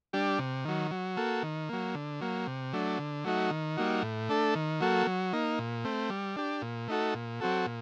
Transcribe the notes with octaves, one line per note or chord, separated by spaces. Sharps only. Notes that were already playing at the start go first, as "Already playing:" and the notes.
G3 D4 G4
C3
D#3 F#3
F#3
A#3 F#4 A4
D#3
F#3 A#3
D3
F#3 A#3
C3
F#3 A3 D4
D3
F#3 A3 D#4 F#4
D#3
G3 A#3 D#4 F#4
A2
A3 D4 A4
D#3
F#3 A#3 F#4 A4
F#3
A#3 D#4
A#2
A3 C4
G3
D4 G4
A#2
A3 D#4 F#4 A4
A#2
F#3 C4 F#4 A4
A#2